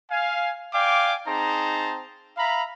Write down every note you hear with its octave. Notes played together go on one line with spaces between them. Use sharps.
F5 G#5
D5 F5 G5 G#5 D6
C4 D#4 G#4 C5 A5 A#5
E5 F5 A#5 B5